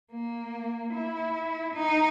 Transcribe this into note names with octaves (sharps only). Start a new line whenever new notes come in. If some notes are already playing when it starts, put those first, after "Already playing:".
A#3
E4
D#4